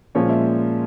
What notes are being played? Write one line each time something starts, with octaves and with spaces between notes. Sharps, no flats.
A#2 F3 G#3 C#4 C#5
E5